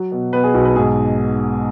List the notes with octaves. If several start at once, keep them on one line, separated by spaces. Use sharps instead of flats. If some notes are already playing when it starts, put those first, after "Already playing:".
Already playing: F#3
B2
B2 B4
G#4
B1 F#4
B4
G#2 G#4